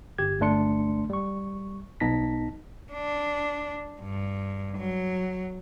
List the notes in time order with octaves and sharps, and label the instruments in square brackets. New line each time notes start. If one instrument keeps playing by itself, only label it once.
[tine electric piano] G1 G4 G#6
G1 A3 D4 C6 C#7
G3 C#6
B1 B3 D#4 A5 A#6 B6
[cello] D4
G2
F#3